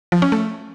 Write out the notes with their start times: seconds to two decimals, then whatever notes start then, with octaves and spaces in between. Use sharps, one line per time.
0.12 F3
0.22 C#4
0.32 A3